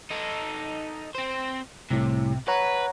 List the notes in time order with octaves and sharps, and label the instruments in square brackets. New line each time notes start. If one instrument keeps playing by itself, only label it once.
[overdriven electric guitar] D#4 A4
C4 C5
[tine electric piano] C2 A2 [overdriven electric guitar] C3
[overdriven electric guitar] B4 [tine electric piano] C#5 F#5 A#5